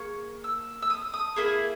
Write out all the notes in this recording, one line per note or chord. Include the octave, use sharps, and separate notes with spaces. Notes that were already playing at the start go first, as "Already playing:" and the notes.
Already playing: A#3 G#4 C#6
E6
E6
D#6
D#6
A#3 E4 G#4